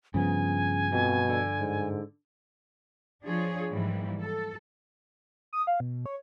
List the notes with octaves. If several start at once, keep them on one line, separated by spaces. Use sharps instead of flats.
G2 C#3 F3 B3 G#5
F2 B2
D3
G#2
F3 D4 F4 G#4 C#5
G#2 E3 F3 G3 A#3
A4
D#6
F5
B2
C#5